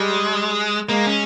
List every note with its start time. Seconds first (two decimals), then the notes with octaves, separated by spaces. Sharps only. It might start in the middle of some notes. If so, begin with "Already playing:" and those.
Already playing: G3 G#3
0.89 G#3 A#3
1.07 C#4